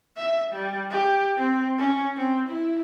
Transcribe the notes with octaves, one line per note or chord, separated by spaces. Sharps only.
E5
G3
G4
C4
C#4
C4
E4